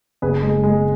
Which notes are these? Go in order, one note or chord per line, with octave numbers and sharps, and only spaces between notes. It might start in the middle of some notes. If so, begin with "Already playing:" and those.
F#1 G#4 B4
G#3
G#3